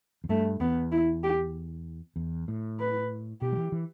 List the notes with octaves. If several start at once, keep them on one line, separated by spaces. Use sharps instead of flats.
E2
G2 A3
E2 B3
E4
G4
E2
A2
B4
B2 G4
G3
E3
E3